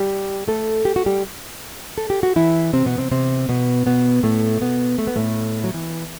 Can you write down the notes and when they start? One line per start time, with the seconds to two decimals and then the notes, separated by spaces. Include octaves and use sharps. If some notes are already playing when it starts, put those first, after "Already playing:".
Already playing: G3 G4
0.48 A3 A4
0.85 G4
0.96 F#4
1.06 G3 G4
1.98 A4
2.10 G4
2.23 F#4
2.36 E3 E4
2.73 C3 C4
2.86 B2 B3
2.98 C3 C4
3.11 C3 C4
3.49 B2 B3
3.86 B2 B3
4.23 A2 A3
4.61 B2 B3
4.98 A3
5.07 B3
5.16 A2 A3
5.64 F#3
5.74 E3